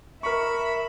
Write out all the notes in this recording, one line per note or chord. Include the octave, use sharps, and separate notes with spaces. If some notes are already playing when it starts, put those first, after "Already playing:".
A#4 E5 B5 C#6